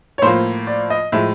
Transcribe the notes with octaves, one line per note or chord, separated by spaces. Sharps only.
C#5
A2 F3 A#3 C5
D5
D#5
A2 F3 G#3 E5